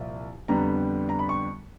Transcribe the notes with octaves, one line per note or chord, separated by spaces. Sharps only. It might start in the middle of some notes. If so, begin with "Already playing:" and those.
Already playing: C2 A#2 F3
F2 D3 G3 B3 A#5
A#5
B5
C#6